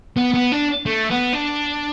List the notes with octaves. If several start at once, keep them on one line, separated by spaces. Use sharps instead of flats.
B3
B3
D4
A3
B3
D4